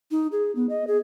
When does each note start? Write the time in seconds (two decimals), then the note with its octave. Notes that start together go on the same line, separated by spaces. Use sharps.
0.11 D#4
0.32 G#4
0.55 B3
0.69 D#5
0.87 G#4